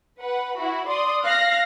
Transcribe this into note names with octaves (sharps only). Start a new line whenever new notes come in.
B4 F#5
E4 F#4 B5
D5 C6 D#6
F5 F6 F#6 A#6 C7